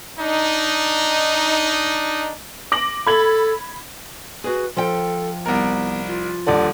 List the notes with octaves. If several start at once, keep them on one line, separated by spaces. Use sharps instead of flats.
D4 D#4
D6 A#6 F#7
A4 B5 G#6 F#7
F#4 G#4 B4
F3 A4 G5
C2 B3 A#4
F4
D#1 D3 D5